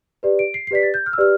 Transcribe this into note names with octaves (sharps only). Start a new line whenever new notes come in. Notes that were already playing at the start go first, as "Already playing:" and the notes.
G4 B4 D5
D7
C7
C7
G4 B4 D5 B6
A6
G6
F6
E6
G4 B4 D5 F6